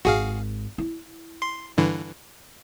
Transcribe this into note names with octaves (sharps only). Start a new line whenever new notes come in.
G#1 F#4 G#4 F5
E4
C6
G2 D3 E3